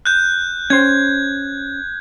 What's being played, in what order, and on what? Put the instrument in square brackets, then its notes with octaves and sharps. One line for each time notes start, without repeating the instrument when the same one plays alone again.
[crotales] F#6 G6
[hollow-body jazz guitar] C#4 C5 [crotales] G#6